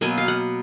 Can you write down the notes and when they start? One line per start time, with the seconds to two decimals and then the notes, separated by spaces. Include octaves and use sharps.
0.01 B2 F#3 A#3 G#5
0.18 F5
0.28 F#5